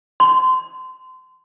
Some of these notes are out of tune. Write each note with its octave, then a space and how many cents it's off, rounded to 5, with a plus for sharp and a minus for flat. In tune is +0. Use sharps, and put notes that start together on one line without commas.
C6 -25